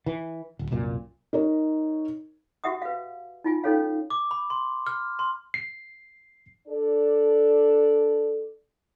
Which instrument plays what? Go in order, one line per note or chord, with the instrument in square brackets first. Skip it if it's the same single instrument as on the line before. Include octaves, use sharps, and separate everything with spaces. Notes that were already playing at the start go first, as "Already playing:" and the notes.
[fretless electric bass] E3
D1
C2 F#2 A#2
[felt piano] D#4 A#4 C#5
[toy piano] F#4 G4 E5 F#5 D#6
B4 F5
D#4 F4 G#5
C#4 D#4 A4 C#5 F5
[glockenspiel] D6
B5
C6
F6
C6
[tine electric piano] C7
[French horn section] D4 A4 D5